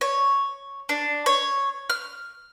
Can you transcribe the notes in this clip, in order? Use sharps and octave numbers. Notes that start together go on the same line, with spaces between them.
C#5
D4
C#5
F6